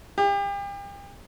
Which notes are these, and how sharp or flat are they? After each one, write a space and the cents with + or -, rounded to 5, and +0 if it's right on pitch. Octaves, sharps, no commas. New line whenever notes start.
G4 +35